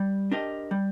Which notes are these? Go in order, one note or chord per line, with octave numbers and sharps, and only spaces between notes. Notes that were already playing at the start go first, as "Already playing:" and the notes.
Already playing: G3
D4 G4 A#4 D#5
G3